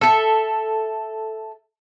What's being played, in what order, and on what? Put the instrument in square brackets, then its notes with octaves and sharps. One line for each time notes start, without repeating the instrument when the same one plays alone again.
[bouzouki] A4 E5